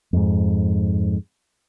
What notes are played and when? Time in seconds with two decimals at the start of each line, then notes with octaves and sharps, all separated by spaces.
0.13 F2 G#2